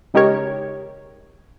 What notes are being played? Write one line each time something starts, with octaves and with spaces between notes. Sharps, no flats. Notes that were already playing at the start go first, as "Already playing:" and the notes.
C#3 G#3 D#4 G4 A#4 C#5